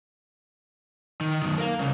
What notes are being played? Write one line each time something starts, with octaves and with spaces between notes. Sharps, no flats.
D#3
F#2 D#3
A#4 F5
C2 C#3